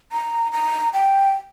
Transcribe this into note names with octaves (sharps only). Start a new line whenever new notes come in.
A#5
A#5
G5